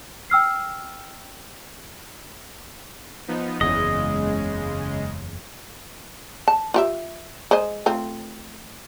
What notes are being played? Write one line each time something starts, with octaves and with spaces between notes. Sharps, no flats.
G5 E6 F6 C7
F3 B3 D#4
F#1 E2 C#3 G#3 D#5
A5
F4 G4 E5
G#3 C5 D#5
A3 C4 F4